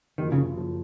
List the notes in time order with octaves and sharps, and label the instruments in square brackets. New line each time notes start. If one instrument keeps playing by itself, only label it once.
[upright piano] F#1 F#2 F3 [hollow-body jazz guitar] D#3
[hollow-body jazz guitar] C#3
[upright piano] F#1 F#2 F3